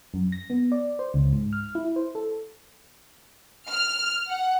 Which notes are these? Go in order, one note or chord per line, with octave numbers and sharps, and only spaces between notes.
F#2
A#6
B3
D5
C5
C#2
G#2
F6
E4
C5
A4
F6
F#5